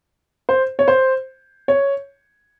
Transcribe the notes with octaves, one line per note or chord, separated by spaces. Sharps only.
C5
C#5
C5
C#5